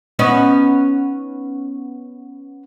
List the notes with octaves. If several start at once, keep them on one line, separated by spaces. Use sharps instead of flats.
B3 C#4 D#4